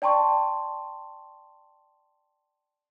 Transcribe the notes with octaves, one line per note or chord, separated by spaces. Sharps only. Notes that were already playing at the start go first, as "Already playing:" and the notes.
D5 G5 A5 C6 C#6